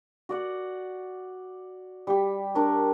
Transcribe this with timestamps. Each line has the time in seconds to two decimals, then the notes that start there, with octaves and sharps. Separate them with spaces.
0.29 F#4 D5 F#5
2.07 G3 G4
2.55 D4 A#4 C#5